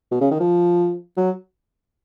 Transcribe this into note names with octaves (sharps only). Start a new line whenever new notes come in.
B2
C#3
D#3
F3
F#3